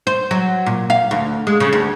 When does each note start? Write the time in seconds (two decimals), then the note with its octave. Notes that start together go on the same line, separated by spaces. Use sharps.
0.07 C5
0.31 F#3
0.66 A#2
0.90 F5
1.11 D2
1.47 G#3
1.60 C#3
1.73 D2